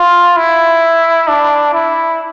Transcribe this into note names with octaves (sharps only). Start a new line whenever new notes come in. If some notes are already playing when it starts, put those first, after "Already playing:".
Already playing: F4
E4
D4
E4